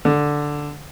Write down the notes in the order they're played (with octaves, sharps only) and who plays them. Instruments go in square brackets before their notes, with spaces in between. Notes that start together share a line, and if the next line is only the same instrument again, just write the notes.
[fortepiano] D3